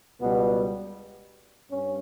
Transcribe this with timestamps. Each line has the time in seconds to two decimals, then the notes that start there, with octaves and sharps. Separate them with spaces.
0.20 C#2 B2 G3 B3
1.70 G2 C#4